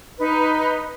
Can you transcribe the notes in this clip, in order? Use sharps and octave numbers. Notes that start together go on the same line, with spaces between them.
D#4 B4